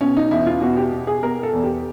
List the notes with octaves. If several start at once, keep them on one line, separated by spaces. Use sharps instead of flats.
B2 C#4
D#4
E2 E4
F4
B2 F#4
G4
B2
G#4
B2 A#4
A4
E2
G4